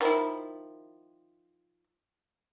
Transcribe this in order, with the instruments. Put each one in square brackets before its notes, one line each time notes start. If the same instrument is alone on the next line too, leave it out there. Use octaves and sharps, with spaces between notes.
[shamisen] D#3 F3 E4